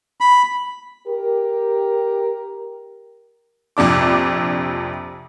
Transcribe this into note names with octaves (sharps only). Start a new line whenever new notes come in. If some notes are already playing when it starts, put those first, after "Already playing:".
B5
G4 A#4
A#1 F2 C3 D4 D6